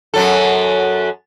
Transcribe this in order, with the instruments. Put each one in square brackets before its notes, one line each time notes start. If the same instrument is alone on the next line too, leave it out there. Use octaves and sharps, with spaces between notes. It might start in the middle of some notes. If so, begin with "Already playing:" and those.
[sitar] F#2 F#3 A4